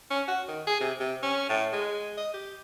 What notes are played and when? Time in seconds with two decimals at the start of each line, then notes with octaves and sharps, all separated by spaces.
0.11 C#4
0.28 F#4
0.48 D#3
0.67 G#4
0.81 C3
1.00 C3
1.23 C#4
1.49 A2
1.73 G#3
2.18 D#5
2.34 G4